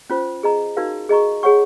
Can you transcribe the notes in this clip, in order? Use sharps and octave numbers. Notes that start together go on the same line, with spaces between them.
C#4 F4 C5
G#4 D#5 A#5
D#4 F#4 A#4 F5
G#4 D#5 A#5 C#6
G#4 C#5 F#5 C#6